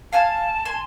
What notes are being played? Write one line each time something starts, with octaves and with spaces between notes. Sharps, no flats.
F5 G#5 A5 F6
G#5 C6